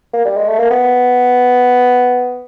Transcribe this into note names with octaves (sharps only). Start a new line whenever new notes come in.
A#3
G3
G#3
A3
A#3
B3